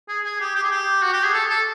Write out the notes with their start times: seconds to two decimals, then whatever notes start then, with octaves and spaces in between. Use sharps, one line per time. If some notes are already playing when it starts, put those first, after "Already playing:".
0.08 G#4
0.25 G#4
0.40 G4
0.55 G4
0.63 G#4
0.71 G4
1.02 F#4
1.13 G4
1.23 G#4
1.33 A4
1.49 A4